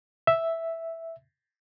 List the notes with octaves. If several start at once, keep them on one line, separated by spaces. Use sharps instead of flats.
E5